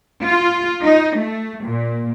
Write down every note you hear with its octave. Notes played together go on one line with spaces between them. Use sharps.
F4
D#4
A3
A#2